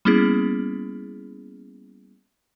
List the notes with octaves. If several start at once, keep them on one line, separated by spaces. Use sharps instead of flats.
G3 A#3 B3 C#4 E4 G#4